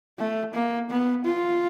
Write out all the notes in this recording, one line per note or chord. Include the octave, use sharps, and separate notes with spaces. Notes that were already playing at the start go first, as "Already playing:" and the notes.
A3
A#3
B3
F4